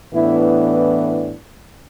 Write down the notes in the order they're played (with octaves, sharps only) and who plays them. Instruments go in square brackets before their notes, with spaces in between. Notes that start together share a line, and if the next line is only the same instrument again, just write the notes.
[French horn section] A2 E3 B3 D4 E4